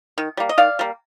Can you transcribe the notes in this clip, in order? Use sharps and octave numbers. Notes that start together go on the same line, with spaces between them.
D#3
G3 A#3
D#5
D#3 D5 F5
G3 A#3